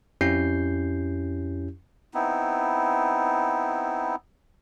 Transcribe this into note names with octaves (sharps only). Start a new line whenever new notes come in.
F2 C#4 E4 G4 G6 C7
B3 C4 D#4 E4